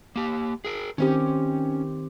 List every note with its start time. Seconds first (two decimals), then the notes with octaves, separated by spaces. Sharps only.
0.16 A#3 G4
0.65 G#4 A#4
0.98 D#3 C4 C#4 G4